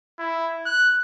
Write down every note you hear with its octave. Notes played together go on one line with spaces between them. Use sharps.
E4
F#6